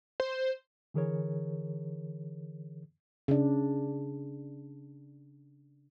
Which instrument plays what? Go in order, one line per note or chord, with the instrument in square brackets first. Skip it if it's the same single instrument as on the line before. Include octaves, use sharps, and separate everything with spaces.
[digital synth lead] C5
[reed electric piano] D3 E3 G#4 A#4 C#5
[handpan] C#3 D4